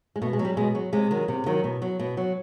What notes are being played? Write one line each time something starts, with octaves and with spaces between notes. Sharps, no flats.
G#3
B2 A3
G#3
F#3
G3
B2 G#3
F#3
C3 G#3
D#3 F#3
C3
D#3 F#3
B2
F#3
B2
F#3